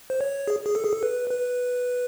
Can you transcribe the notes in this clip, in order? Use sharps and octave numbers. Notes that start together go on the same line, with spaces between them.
C5
C#5
G#4
G#4
A4
G#4
A4
B4
B4